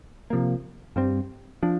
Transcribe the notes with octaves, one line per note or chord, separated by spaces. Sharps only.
C3 F3 A#3
G2 G3 C4
F3 D4